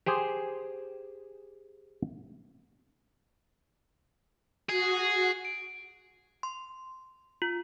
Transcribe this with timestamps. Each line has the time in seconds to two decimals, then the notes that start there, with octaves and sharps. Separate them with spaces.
0.06 G4 G#4 C5
4.69 F#4 G#4
5.45 D7
6.43 C6
7.42 F4